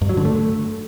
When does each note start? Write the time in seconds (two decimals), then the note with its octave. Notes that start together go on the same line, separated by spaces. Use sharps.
0.02 G2
0.09 F#3
0.17 D3
0.25 A3